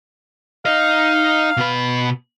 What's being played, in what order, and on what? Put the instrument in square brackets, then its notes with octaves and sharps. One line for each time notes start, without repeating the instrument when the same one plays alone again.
[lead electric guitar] D#4 D#5 [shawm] F5
[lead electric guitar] B2 B4